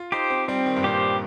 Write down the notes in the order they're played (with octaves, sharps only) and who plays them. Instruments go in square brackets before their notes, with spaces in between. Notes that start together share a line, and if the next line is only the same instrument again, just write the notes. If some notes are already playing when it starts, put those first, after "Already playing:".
Already playing: [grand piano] F4
[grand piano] D#4 [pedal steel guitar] G4 C5
[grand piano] C4
[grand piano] G3 [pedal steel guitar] C4
[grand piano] D#3
G2
[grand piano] A#2 [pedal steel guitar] G4 C5